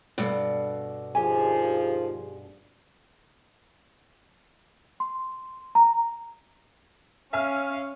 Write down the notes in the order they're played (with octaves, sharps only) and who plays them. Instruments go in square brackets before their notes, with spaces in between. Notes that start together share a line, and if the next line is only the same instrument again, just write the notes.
[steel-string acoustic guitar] G2 B2 [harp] D4 A4 D5
[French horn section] D#2 F3 G#4 [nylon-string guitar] G4 G#5
[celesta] C6
A#5
[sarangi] C#4 [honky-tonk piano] E5 G#5 F6 [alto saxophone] F5